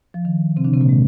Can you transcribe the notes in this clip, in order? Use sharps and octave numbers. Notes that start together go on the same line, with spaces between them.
F3
D#3
C3 C4
D3 D4
C3 C4
A#2 A#3
G#3